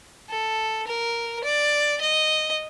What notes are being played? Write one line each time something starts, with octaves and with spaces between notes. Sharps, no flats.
A4
A#4
D5
D#5